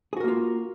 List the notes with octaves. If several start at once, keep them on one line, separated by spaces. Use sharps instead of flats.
A#3 F4 F#4 G#4 A#4